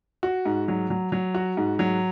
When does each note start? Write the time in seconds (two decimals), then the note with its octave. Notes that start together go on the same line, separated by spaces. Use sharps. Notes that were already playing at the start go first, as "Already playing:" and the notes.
0.23 F#4
0.45 G#2
0.68 F#3
0.90 F#3
1.12 F#3
1.35 F#4
1.57 G#2
1.79 F#3